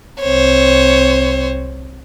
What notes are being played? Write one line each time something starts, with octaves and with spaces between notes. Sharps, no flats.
C2 C4 C5 C#5